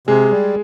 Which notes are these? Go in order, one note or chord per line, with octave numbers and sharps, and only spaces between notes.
C3 G#3 G#4
G3